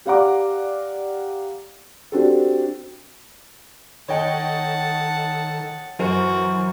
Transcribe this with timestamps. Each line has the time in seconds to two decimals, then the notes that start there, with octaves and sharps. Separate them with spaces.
0.05 G4 D5 F5 F#5 A#5 D6
2.12 C4 D4 F#4 G4 A4
4.08 D#3 A4 C#5 D#5 F#5 G5 A5
5.99 F#2 E3 F#4 A#4 C5